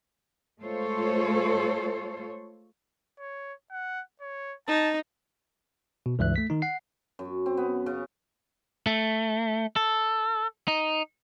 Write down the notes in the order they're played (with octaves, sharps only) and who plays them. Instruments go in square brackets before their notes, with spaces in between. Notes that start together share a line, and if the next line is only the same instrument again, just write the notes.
[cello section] G#3 A3 F4 A4 C5 C#5
[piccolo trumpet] C#5
F#5
C#5
[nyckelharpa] D#4 [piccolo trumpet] A5
[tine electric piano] B2
C#2 G2 E3 E5 F#6
A3 B6
D#3 D#4
F#5 C7
[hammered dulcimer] F#2
C4
B3
C#3
[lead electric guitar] A3
A4
D#4